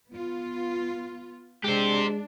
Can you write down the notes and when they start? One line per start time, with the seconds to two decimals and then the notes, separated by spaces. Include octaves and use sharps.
0.10 B3 F4
1.64 G#3 D4 G4 C5